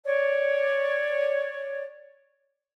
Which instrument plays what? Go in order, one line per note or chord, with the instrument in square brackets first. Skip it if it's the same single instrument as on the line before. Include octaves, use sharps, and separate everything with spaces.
[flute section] C#5 D5